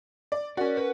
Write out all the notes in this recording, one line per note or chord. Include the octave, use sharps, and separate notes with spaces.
D5
C#4 F#4 A#4 D5
B4